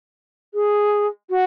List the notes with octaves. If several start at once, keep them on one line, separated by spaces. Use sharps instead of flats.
G#4
F#4